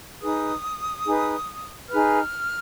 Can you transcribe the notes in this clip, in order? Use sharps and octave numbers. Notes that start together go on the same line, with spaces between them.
D#4 G#4 B4 D#6
D#4 G#4 B4
D#4 G#4 B4 F6